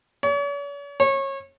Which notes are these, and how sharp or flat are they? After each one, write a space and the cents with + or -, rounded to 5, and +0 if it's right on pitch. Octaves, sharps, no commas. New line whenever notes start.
C#5 +45
C#5 -25